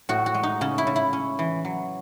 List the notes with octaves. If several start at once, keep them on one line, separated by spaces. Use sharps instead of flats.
A2 F#4
F#4
G#3
D#4
C#3 C#4
E4
C#3
E4
C#4
E3
F#3